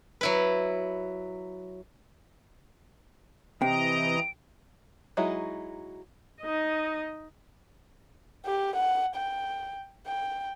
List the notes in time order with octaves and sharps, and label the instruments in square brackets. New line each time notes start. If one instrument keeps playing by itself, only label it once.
[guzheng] F#3 E4 B4
[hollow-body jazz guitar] C3 [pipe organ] E3 D#5 A#5 [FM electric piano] G5 [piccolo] D7
[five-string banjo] F#3 G#3 D#4 E4 F#4
[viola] D#4 D#5
[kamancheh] G4
F#5
G5
G5